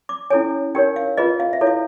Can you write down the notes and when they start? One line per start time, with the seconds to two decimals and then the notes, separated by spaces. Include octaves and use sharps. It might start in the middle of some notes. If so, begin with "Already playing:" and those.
0.09 D6
0.30 C#4 E4 A4 C#5 G#5
0.75 D#4 G4 A#4 C#5 G5
0.96 F5
1.17 F4 G#4 B4 D#5
1.40 F5
1.53 E5
1.61 E4 A4 C#5
1.67 F5